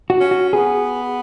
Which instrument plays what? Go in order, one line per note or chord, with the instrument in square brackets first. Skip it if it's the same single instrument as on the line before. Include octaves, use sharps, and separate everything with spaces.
[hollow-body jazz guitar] F#4
[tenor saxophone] C#4
[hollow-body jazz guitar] F#4
[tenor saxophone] B3 [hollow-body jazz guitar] G#4